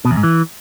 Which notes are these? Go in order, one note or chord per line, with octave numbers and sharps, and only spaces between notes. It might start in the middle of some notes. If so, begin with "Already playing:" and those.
B2
E2
G#2
E3